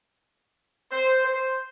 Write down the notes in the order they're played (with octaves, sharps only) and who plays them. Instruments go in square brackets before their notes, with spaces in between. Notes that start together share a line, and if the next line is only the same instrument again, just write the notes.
[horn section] C5
C5